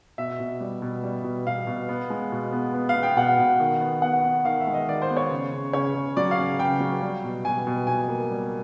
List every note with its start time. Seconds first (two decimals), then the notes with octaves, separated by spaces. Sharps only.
0.18 B2 E5
0.40 B2
0.61 G3
0.82 B2
1.03 G3
1.24 B2
1.46 B2 F5
1.67 B2
1.89 B3
2.10 G#3
2.32 B2
2.52 B3
2.74 B3
2.89 F5
2.95 B3
3.03 G5
3.17 B2 F#5
3.39 B2
3.60 D#3
3.81 B3
4.02 B3 F#5
4.24 B3
4.45 D#3 F5
4.60 E5
4.67 G#3
4.74 D#5
4.88 D#3 D5
5.02 C5
5.10 B3
5.17 C#5
5.30 C#3
5.52 C#3
5.73 C#3 C#5
5.95 C#3
6.17 F#3 D5
6.31 F5
6.38 C#3
6.59 C#3 G5
6.80 F#3
7.02 G3
7.24 B2
7.45 B2 G#5
7.67 B2
7.87 B2 G#5
8.08 A#3
8.30 G3